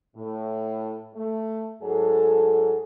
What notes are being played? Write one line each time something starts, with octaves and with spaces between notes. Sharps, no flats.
A2
A3
G#2 F#3 G#4 A4